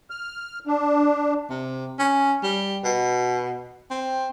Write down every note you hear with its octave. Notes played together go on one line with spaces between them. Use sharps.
F6
D4
C3
C#4
G3
B2
C4